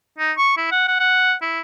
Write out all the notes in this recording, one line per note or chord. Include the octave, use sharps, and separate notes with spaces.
D#4
C#6
E4
F#5
F#5
F#5
E4